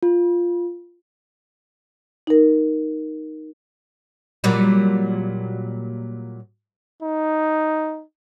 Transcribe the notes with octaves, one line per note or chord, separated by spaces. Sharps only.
F4
D#4 A#4
A#2 F#3 G3
D#4